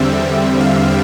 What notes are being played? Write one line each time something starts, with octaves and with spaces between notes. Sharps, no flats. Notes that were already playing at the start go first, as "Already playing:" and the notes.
Already playing: E2 D3 G3 C4 E5
F5